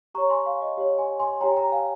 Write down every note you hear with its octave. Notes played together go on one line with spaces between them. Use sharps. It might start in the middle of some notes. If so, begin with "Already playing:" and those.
G4 C#5 A#5 C#6
G#5 C6
F5
D#5
G4 C#5 F5
G#5 C6
G#5 C6
G4 C#5 G5 A#5
G#5
G5 A#5
F5 G#5